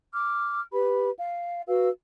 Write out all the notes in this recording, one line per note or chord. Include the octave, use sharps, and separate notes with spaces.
D6 F6
G4 B4 B5
F5
F#4 B4 F5 E6